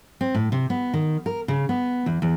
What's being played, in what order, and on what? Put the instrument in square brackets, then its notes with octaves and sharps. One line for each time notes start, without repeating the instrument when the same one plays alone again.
[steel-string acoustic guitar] C4
A2
C3
B3
D#3
A#4
C#3
B3
E2
E2